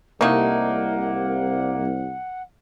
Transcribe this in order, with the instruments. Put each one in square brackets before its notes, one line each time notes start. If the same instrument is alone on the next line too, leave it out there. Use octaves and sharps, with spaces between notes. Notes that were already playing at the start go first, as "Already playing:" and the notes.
[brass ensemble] C2 [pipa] A3 D#4 [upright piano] A#3 [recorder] F#5